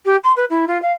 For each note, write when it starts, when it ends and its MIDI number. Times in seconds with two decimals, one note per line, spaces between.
0.05 0.16 67
0.24 0.32 84
0.36 0.45 71
0.50 0.65 64
0.68 0.80 65
0.82 0.92 77